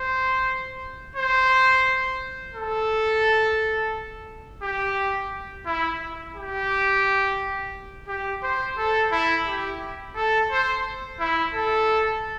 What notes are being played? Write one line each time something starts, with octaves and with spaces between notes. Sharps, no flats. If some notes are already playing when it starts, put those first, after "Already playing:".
Already playing: C5
C5
A4
G4
E4
G4
G4
C5
A4
E4
G4
A4
C5
E4
A4